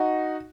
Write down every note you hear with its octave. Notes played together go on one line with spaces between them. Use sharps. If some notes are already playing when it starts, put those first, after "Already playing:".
Already playing: D#4 F#4